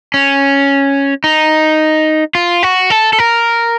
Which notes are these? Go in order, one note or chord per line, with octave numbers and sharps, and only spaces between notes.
C#4
D#4
F4
F#4
A4
A4
A#4